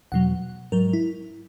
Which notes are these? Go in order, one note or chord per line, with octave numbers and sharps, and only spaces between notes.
E2 B2 F#3 F#5
G#2 F#3 A#4
E4